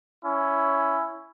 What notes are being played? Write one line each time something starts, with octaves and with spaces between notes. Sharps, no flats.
C#4 E4